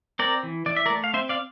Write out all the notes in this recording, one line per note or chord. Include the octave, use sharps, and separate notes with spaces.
C4 A#4 D5
E3
E3 D5
E5
A#4 D5
A3
F5
C4 C5 E5
D5 F5